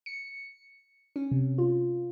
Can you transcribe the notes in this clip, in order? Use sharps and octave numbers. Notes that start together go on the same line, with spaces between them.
C#7
C#4
C3
F4